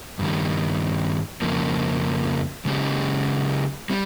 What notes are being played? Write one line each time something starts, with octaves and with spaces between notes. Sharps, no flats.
G2 D#3 G3
F2 C#3 F3 A#3
C#3 G#3 C#4 G4
G3 C4